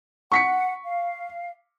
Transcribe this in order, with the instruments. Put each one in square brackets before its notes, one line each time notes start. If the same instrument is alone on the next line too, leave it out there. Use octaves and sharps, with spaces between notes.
[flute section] F#5 [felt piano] C#6 B6 C#7
[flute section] F5